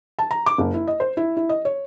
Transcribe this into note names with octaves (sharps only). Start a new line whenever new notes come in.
A5
A#5
D6
F#1
E4
D#5
C5
E4
E4
D#5
C#5